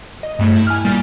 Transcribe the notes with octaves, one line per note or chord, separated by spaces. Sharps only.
D#5
G2 A3
E4
G#5 F6
A#2 G3 A#3